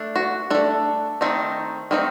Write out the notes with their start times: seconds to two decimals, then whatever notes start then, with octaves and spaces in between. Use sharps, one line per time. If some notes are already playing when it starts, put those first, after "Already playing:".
Already playing: A3 D4
0.16 F#4
0.50 A3 D4 A4
1.21 D#3 A3 C4 D#4
1.91 D#3 A3 C4 D#4